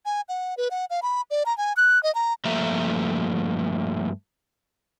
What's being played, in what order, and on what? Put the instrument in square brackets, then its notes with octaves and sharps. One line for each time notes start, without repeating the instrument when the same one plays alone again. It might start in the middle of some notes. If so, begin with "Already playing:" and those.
[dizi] G#5
F#5
B4
F#5
F5
B5
D5
A#5
G#5
F#6
D#5
A#5
[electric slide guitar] G2 F3 A3 A#3 E5 A#5